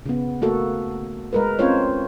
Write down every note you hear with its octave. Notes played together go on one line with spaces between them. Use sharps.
C#3 B3
A3 A#3 F#4 A4
G#3 A#4 B4
C4 C#4 F4 C5 C#5